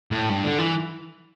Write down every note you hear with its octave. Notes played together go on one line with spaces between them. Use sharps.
A2
G2
D3
E3